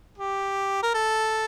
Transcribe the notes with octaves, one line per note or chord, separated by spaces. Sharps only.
G4
A#4
A4